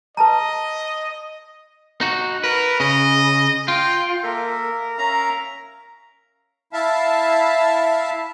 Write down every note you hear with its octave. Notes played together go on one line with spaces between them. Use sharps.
B4 D#5 A5 A#5
D#4 F#4
A#4 B4
C#3 D#5
F4 G5
A#3 A4 A#4 E5
C#4 E5 F5 A#5
E4 E5 F5 A5